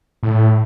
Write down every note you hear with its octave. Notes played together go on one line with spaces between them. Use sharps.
A2